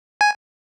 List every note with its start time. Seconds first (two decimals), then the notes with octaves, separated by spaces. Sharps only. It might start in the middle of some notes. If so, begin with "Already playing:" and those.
0.21 G#5